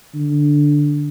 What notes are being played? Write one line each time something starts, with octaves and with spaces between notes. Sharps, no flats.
D3